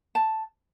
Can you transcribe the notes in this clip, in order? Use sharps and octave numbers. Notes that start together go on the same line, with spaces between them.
A5